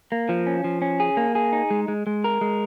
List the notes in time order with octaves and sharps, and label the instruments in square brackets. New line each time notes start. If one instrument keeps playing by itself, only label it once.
[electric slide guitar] A#3
F3
C#4
F3
C#4
G#4
A#3
G#4
D#4
G#3
G#3
G#3
A#4
G#3